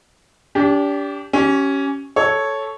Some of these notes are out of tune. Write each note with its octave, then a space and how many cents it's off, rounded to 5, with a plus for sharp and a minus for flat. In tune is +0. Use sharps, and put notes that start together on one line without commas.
D4 -35 G4 +0
C#4 +0 G4 -35
A4 -5 C#5 +0